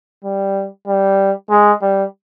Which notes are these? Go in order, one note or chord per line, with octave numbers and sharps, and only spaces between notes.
G3
G3
G#3
G3